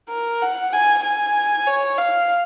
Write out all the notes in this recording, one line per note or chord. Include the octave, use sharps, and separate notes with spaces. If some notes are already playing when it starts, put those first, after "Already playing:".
A#4
F#5
G#5
G#5
C#5
F5